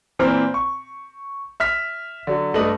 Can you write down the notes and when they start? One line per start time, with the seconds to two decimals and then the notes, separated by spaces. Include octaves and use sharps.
0.19 A#2 E3 C4 C5 A#5 F6
0.54 C#6
1.60 E5 F6 B6
2.27 D3 F#3
2.54 G2 A3 D4 B4 D#5 F#7